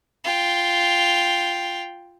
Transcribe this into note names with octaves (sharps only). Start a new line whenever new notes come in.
F4 G5